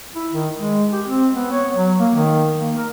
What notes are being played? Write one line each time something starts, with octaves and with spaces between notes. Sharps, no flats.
E4
D#3
G#3
G4
C4
B3
C#5
F#3
A#3
D#3
A#3
A#4